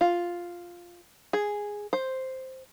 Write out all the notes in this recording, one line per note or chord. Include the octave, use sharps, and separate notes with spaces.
F4
G#4
C5